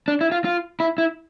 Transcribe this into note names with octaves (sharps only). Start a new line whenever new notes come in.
D4
E4
F4
F4
E4
E4